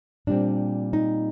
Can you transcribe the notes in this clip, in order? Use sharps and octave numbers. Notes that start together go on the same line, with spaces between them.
A#2 G3 C4 D4
D#4